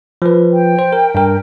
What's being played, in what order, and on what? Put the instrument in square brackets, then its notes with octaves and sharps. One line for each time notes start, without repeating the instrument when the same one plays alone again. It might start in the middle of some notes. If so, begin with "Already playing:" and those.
[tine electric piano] F3 B4
[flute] G5
[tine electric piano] C5
A#4
G2 A#4